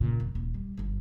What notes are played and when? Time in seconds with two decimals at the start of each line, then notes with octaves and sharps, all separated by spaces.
0.01 A#2 C#3
0.20 F1
0.35 D#1 E3
0.54 G3
0.78 G1 G2